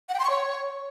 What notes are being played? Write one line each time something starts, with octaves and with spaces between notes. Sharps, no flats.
F#5
G5
C6
C#6
C#5